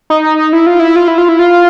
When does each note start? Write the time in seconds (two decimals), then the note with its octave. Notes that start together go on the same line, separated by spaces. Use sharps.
0.10 D#4
0.53 E4
0.67 F4
0.79 E4
0.96 F4
1.08 E4
1.18 F4
1.29 E4
1.39 F4